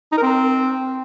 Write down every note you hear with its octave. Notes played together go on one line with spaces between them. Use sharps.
D#4
A#4
C4